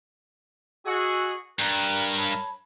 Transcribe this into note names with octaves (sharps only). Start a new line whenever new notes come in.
F#4 G#4 D#5 E6
G2 A#4 A#5 F#6
C#5 A5 B5